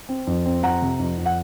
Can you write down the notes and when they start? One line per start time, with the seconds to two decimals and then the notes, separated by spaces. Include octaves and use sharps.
0.09 C4
0.27 F2
0.46 C4
0.63 F2 F#5 A#5
0.82 C3
0.99 F2
1.18 F2
1.26 F#5